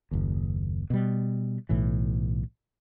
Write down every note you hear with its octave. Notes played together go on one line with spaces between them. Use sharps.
F#1 D#2
B2 G3
B1 A2 E3